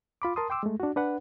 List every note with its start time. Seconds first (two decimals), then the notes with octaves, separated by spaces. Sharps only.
0.22 F4 B5 D6
0.36 A#4 A5 C6 D#6
0.50 G5 C6 D6 E6
0.63 G#3 A3
0.80 D4 F#4
0.96 D4 B4 F#5